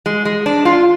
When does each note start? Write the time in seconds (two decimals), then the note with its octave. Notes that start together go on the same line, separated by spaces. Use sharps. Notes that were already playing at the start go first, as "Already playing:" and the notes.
0.06 G#3
0.25 G#3
0.46 D4
0.65 F4